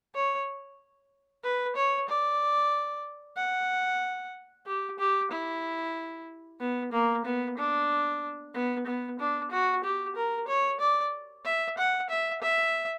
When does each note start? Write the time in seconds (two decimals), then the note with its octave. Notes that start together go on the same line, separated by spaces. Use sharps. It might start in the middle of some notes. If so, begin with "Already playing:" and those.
0.15 C#5
1.43 B4
1.76 C#5
2.08 D5
3.37 F#5
4.67 G4
4.99 G4
5.31 E4
6.60 B3
6.92 A#3
7.25 B3
7.57 D4
8.54 B3
8.86 B3
9.19 D4
9.51 F#4
9.84 G4
10.16 A#4
10.48 C#5
10.80 D5
11.45 E5
11.78 F#5
12.09 E5
12.42 E5